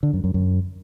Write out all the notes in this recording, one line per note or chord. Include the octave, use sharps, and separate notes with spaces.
D3
F#2
F#2
F#2